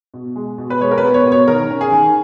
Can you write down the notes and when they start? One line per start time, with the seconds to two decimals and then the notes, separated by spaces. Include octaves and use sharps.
0.14 B2
0.36 G#3
0.58 B2
0.70 B4
0.81 G#3 C#5
0.91 A#4
0.98 B4
1.03 B3
1.14 C#5
1.25 B2
1.32 C#5
1.48 D#3 A#4
1.70 C#4
1.81 G#4
1.92 D#3